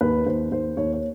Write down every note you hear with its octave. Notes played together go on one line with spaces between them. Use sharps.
D#2 B4
D#2 C5
D#2 C5
D#2 C#5
C#5